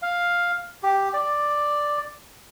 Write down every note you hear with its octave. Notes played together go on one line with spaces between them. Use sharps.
F5
G4
D5